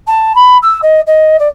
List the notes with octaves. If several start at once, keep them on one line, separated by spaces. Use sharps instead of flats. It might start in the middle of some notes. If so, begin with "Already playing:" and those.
A5
B5
E6
D#5
D#5
D5